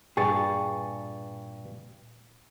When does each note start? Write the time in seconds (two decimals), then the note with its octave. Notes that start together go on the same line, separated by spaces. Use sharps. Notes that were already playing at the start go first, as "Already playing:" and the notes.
0.17 G2 A#2 G#4 G5 C#6 A6